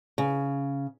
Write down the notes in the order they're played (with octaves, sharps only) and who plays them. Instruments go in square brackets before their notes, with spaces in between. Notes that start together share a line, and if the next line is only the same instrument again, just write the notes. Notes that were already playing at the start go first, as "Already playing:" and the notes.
[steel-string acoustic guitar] C#3